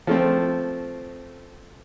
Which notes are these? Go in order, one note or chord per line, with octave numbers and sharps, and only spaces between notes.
F3 A3 C4